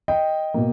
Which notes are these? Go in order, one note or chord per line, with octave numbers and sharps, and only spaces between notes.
D#5 G5
B2 A#3